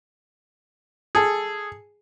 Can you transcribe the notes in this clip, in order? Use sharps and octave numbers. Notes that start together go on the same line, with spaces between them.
G#4 A4